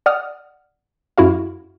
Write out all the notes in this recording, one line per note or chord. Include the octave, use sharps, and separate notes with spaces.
D5 F#5 D#6 F6
F#2 E4 F#4 F5